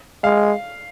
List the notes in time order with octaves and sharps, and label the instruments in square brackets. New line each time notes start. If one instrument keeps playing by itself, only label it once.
[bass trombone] G#3 [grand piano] F5